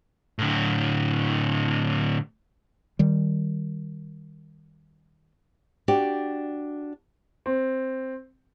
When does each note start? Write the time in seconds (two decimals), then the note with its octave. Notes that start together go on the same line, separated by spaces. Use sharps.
0.39 A2 D3
2.99 D#3 G3
5.88 D4 F#4 G4 D5
7.46 C4